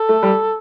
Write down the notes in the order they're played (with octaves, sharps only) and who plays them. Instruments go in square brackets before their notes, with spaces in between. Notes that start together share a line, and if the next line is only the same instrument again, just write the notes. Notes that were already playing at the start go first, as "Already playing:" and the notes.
Already playing: [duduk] A4
[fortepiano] A3
G3